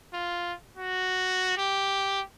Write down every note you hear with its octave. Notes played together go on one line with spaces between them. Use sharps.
F4
F#4
G4